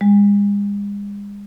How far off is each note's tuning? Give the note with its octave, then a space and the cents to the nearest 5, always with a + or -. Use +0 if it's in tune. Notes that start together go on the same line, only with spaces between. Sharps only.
G#3 -40